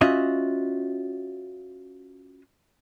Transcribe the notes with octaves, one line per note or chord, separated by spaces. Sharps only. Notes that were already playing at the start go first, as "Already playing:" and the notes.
C#4 F4 F#4 D#5 E5